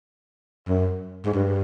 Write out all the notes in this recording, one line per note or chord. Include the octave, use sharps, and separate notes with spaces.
F#2
G#2
G2